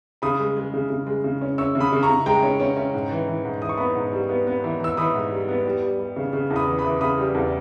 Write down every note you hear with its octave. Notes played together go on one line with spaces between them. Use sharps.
C#3 B5 D#6
G#3
G#3
C#3
C#3
G#3
C#3
C#4
C#4 C#6 E6
C#3
B5 D#6
C#3
A#5 C#6
C#3
G#3 G5 A#5
C#4
C#4
C#4
G#2
E3
E3
G#2
E3 D#6
C#6
B3 B5 D#6
G#2
G3
B3
B3
E3
E3 E6
E3 B5 D#6
G#2
G3
B3
G3
G3
G3
C#3
C#3
E2
B5 D#6
E3
B5 D#6
E3
C#3 B5 D#6
G3
E2